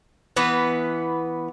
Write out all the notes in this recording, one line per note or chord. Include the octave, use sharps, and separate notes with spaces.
E3 B3 B4